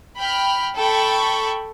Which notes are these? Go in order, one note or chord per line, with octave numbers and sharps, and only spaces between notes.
G5 B5 F6
A4 G5 B5 C#6